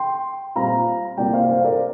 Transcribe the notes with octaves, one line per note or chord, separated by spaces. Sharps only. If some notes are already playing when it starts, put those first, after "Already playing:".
Already playing: G5 C6
A#2 G3 C4 F5 A#5
C2 C3 A#3 D5 G5
C5 F5
C5 F5
A#4 D5